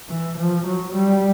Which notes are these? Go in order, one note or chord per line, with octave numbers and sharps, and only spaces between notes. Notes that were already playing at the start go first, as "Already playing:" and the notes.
E3
F3
F#3
G3